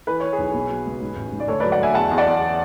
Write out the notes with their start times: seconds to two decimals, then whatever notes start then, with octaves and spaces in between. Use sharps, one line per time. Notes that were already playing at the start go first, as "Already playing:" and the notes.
0.07 E3 B4
0.20 E3 C#5
0.33 G#4 B4
0.38 B1
0.54 B2
0.70 F#3
0.86 C#2
1.01 G#2
1.16 A1
1.32 G#2
1.40 D5
1.47 D2 A4 C#5
1.60 B4 D5
1.64 F#3
1.71 D5 F#5
1.79 D2 E5 G#5
1.94 E2 F#5 A5
2.11 E2
2.18 D5 F#5
2.26 E2